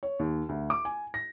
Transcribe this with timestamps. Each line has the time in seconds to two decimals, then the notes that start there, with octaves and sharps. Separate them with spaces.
0.03 C#5
0.19 D#2
0.49 D2
0.70 D6
0.85 G#5
1.14 A#6